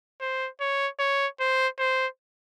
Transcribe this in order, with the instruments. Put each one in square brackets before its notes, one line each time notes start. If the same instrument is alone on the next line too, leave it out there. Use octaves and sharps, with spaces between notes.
[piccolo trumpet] C5
C#5
C#5
C5
C5